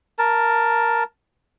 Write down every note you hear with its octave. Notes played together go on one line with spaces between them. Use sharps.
A#4 A5